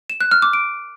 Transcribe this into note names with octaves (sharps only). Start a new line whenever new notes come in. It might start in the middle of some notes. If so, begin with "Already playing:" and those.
E7
F#6
F6
D6
D7